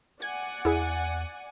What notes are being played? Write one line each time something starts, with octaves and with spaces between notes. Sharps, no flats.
D5 F#5 G#5 G#6
E2 E4 G#4